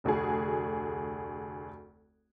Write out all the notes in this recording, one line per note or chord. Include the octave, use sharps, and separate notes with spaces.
F1 D2 F#4 G#4